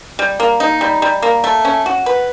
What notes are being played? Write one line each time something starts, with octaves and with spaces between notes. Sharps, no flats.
G3
A#3
D#4
G3
G3
A#3
A3
C#4
F#4
B4